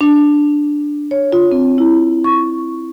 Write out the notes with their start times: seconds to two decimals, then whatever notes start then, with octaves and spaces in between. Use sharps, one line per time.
0.01 D4
1.11 C#5
1.32 F4
1.52 C4
1.78 E4
2.24 C#6